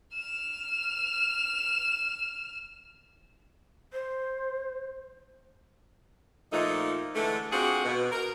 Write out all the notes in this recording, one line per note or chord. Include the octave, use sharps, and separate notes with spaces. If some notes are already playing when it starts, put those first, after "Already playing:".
F6 E7
C5
A#2 F3 A3 D#4
D3 E3 G#3 A3
C4 D4 F4 F#4 G#4
B2
A#4